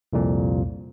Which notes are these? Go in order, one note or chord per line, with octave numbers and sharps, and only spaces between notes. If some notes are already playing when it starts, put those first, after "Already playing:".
C2 F2 A#2